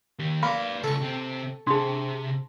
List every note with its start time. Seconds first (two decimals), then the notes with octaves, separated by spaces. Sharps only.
0.19 D#3 G4
0.43 A#3 B4 D5 B5
0.84 C#2 A4 C#6
1.01 C3 C4
1.67 C3 D4 G#4 A5 C6